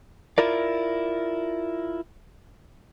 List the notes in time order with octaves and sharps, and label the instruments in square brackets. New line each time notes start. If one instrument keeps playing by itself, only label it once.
[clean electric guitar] E4 F4 A#4 D5